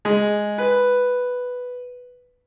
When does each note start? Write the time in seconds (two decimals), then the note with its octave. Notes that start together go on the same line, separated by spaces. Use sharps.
0.05 G#3
0.58 B4